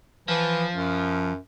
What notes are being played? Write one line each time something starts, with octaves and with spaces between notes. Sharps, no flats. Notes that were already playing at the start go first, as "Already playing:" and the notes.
E3 F3
F#2